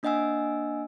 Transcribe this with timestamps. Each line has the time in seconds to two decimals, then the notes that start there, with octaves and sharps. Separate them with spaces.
0.03 A#3 D4 D#5 F#5 G#5 E6